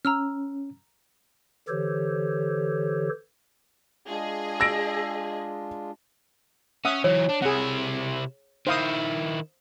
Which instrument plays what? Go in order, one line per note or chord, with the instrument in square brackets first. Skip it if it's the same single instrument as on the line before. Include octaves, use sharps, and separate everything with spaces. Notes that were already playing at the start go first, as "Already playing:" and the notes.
[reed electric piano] C#4 [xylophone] A#5 E6 F6
[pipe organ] D3 E3 G4 A4 C5 C#5
[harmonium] G#3 D4 F4 [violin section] G#4 D#5
[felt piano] E6 A#6 D7
[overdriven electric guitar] C#4 [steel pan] E5 F#5 D#6
[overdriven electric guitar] E3 F#3 [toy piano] C#5
[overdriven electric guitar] D4
[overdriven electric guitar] C3 E4 [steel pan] G#4 F#5
[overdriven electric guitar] D#3 E4 [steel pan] C5 F5 D#6